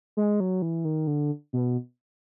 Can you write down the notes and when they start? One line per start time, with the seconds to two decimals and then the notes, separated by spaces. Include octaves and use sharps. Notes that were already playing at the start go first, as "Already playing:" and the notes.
0.17 G#3
0.40 F#3
0.62 E3
0.84 D#3
1.07 D3
1.53 B2